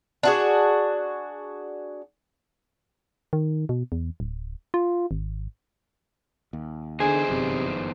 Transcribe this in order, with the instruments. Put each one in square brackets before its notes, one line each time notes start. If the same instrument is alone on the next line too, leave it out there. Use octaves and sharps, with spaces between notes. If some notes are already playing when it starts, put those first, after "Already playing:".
[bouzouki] D4 F#4 G#4
[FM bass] D#3
B2
E2
D1
F4
G#1
[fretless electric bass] D#2
[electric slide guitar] E2 D#4 C5 [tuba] D3 [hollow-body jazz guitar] G#4
[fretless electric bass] G1 F#2 [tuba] C3